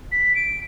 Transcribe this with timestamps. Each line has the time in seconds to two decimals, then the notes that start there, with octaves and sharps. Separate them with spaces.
0.12 B6
0.35 D7